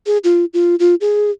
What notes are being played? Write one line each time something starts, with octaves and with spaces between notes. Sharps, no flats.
G#4
F4
F4
F4
G#4